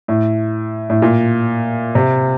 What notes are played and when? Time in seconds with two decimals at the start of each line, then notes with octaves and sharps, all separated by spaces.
0.08 A2
0.90 A2
1.02 A#2
1.95 C3